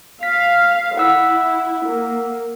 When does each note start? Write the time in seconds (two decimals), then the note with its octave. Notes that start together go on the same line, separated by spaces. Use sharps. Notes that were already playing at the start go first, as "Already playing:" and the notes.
0.23 F5 B6
0.97 E4 F#5 E6 B6
1.85 A#3